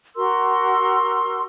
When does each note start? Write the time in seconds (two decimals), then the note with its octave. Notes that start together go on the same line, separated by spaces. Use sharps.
0.16 F#4 A#4 C6 E6